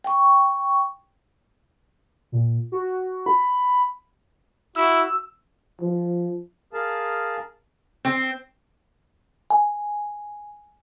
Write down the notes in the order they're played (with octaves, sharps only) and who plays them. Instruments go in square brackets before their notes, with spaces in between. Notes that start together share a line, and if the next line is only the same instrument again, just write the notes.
[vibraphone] G5 C#6
[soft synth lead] A#2
F#4
B5
[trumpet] E4 [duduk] F#4 [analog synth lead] E6
[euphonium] F3
[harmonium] G#4 A#4 F5 A5
[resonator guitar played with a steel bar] C4
[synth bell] G#5